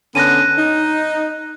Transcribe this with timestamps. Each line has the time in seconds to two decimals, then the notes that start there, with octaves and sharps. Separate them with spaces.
0.15 D3 B3 C#4 F#6 A#6 D#7
0.58 D#4